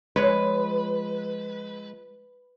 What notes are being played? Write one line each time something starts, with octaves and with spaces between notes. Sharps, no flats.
F3 G#3 B4 C#5